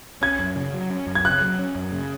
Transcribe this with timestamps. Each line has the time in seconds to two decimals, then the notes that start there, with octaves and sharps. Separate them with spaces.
0.22 C#4 G#6
0.39 F#2
0.56 C#3
0.73 F#3
0.90 C#4
1.07 F#2
1.15 G#6
1.25 C#3 F#6
1.41 F#3
1.59 C#4
1.75 F#2
1.92 C#3